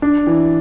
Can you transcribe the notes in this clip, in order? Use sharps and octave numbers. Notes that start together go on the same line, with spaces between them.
D4
E3